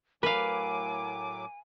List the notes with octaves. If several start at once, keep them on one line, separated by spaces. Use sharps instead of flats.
A2 F#3 A#4 B4 F5 G#5 D6